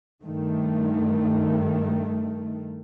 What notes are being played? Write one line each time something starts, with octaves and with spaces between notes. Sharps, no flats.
G2 D#3 A3